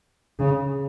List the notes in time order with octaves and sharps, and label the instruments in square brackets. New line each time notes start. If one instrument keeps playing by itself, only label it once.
[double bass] C#3